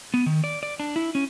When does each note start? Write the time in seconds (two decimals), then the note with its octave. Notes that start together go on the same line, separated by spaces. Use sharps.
0.14 B3
0.26 D#3
0.44 D5
0.63 D5
0.80 D4
0.96 E4
1.15 C#4